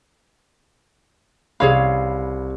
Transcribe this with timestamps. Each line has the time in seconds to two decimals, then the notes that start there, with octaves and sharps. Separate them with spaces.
1.60 C2 G#4 C#5 F5 B5